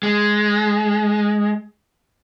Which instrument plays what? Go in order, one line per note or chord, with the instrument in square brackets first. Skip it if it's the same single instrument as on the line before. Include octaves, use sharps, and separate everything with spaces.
[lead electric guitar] G#3